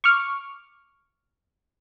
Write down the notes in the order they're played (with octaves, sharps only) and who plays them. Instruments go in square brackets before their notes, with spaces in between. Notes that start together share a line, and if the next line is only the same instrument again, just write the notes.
[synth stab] C#6 D6 F6